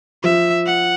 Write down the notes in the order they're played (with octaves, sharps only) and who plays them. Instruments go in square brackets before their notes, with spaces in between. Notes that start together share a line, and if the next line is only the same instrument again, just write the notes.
[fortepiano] F3 [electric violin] E5
[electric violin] F#5